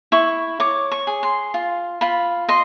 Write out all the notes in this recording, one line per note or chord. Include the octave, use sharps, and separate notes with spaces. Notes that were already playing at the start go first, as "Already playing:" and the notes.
E4 C#6
C#5 D6
C#6
G#4
C6
F4
F4 B5
D#5 C6